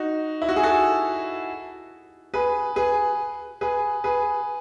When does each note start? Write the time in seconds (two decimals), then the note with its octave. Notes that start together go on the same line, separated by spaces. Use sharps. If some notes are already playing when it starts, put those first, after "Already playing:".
Already playing: D#4 F#4
0.42 E4
0.49 F#4
0.56 G#4
0.63 F#4 A4
2.34 G#4 B4
2.76 G#4 B4
3.61 G#4 B4
4.04 G#4 B4